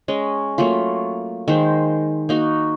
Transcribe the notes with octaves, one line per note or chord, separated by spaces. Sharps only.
G#3 C#4 D#5
F#3 A3 A#3 F4
D#3 G#3 C5
A#3 D#4 F#4